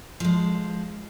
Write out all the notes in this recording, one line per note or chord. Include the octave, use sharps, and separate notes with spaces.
F3 G#3